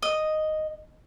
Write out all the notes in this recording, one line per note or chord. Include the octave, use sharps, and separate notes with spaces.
D#5